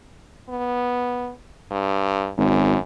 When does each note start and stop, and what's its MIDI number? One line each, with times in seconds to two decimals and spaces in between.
0.49 1.32 59
1.71 2.32 43
2.38 2.76 32
2.38 2.79 42